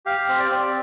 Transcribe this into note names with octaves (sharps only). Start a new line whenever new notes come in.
G4 F5
C4
D5
C4